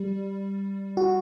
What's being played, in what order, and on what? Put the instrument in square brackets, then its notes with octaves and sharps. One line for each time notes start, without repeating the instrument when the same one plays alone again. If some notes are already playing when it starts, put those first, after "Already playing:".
Already playing: [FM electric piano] G3
F#4